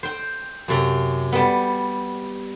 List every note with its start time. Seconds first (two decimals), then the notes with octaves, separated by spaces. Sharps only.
0.03 C5 G5
0.68 F#2 C3
1.32 G3 B3